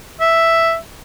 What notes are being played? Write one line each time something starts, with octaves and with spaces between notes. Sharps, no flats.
E5